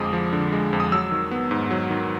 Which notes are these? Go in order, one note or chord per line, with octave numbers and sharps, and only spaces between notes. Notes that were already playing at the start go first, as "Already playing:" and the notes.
Already playing: F2 D3 F3 G#3 D6 D#6
F3
D3
G#3
F2
D#6
F#3 E6
D#3
B3
G#2
F#3
D#3